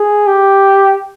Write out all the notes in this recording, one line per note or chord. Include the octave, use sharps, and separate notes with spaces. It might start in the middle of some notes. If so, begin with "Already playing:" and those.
Already playing: G#4
G4